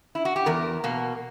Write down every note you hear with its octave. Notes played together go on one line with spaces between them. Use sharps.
E4
F#4
G4
E2 A#4
B2 A#3